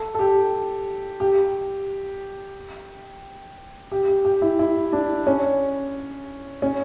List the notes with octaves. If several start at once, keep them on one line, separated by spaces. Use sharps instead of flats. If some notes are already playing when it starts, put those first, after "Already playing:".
Already playing: A4
A4
G4
G4
G4
G4
G4
E4
E4
D4
C#4
C#4